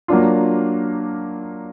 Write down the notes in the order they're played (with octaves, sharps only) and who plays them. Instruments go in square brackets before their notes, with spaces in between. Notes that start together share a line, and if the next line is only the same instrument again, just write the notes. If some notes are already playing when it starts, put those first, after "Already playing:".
[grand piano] F#3 A#3 D4 F4